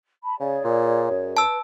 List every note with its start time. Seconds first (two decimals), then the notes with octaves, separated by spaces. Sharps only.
0.23 A5 B5
0.40 C#3 G#4 C#5 D5
0.64 A#2
1.11 F#2
1.37 B4 A5 E6